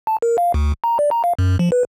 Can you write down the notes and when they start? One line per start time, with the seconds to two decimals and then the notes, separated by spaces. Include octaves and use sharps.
0.07 A5
0.22 A#4
0.38 F5
0.54 D2
0.84 A#5
0.99 D5
1.11 A#5
1.24 F5
1.39 F#2
1.59 F3
1.72 B4